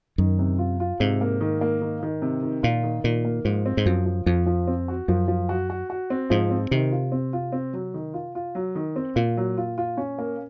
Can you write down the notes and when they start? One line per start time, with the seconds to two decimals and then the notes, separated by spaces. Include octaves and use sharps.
0.18 F#2 D#3
0.39 C3
0.59 F4
0.80 F4
1.00 G#2 C3
1.21 A#3
1.41 D#3
1.61 A#3
1.81 D#3
2.03 D#3
2.22 C3
2.43 D#3
2.63 A#2 F4
2.83 D#3
3.04 A#2 D#3
3.25 A#3
3.45 G#2 F3
3.65 C4
3.77 G#2
3.86 F#2 F3
4.06 F3
4.26 F2 F3
4.46 F3
4.67 C4
4.88 F#4
5.08 F#2 F3
5.28 F3
5.49 F#4
5.70 F#4
5.90 F#4
6.10 C4
6.30 G#2 F3
6.50 C4
6.71 C3 D#3
6.92 F4
7.12 C4
7.33 F4
7.52 C4
7.73 F#3
7.94 D#3
8.14 F4
8.35 F4
8.55 F#3
8.75 D#3
8.96 C4
9.16 A#2 F4
9.37 F#3
9.58 F4
9.78 F4
9.97 C#4
10.19 A#3